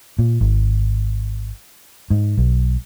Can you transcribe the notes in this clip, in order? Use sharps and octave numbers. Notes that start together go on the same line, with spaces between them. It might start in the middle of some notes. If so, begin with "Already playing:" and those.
A#2
G#1
G#2
B1